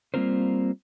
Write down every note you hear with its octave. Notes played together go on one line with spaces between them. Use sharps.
G3 A#3 C4 F4 A#4 C5